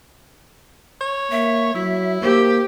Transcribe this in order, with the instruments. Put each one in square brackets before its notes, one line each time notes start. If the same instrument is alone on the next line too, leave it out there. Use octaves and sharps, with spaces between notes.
[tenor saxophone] C#5
[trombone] A#3 [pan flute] E5
[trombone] F#3 [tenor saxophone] E4
[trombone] A#3 [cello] G4 [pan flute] C5